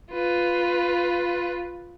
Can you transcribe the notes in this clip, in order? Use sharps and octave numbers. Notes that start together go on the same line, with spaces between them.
F4 B4